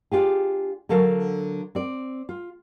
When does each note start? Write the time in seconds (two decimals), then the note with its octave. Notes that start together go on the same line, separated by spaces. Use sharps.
0.11 D4 F4 G4 G#4
0.89 D3 F#3 A4 A#4 F5
1.75 C4 D5
2.29 F4